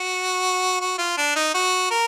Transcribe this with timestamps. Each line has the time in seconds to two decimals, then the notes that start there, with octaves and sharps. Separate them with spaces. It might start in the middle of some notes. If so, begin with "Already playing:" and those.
Already playing: F#4
0.81 F#4
0.98 F4
1.17 D4
1.36 D#4
1.54 F#4
1.91 A#4